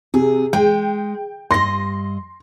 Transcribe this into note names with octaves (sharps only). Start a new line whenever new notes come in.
C3 G#4
G#3 G5
G2 D#5 C6 A#6